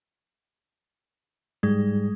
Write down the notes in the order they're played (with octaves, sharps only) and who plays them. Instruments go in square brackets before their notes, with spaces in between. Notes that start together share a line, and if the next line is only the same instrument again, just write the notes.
[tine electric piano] G#2 G3 G#4 [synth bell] G#3